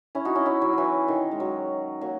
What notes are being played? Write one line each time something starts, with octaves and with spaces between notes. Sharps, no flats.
C#4 E4
D#4 F#4
C#4 E4
C#4 E4
F#3
E3 F#3
D#3
G#3
F#3
F#3 A#3